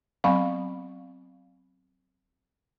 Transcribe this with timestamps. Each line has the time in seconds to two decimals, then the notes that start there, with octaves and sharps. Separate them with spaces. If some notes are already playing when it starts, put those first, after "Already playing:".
0.24 F#3 B3 C4 F5 B5 C#6